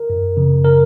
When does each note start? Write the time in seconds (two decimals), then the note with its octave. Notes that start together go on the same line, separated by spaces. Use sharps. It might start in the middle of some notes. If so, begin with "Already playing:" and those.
Already playing: A#4
0.10 F#2
0.37 C#3 F3
0.65 A#4